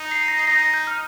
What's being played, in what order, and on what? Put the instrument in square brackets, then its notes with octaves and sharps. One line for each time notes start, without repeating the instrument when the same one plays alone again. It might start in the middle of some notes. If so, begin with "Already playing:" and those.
Already playing: [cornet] D#4
[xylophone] C7
A#6
C7
[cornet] D#4 [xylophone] A#6
[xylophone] A#6
G6
F6